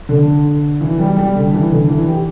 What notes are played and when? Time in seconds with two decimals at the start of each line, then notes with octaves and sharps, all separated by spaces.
0.09 D3
0.81 E3
0.99 G3
1.17 G3
1.36 D3
1.53 E3
1.71 D3
1.89 E3
2.07 G4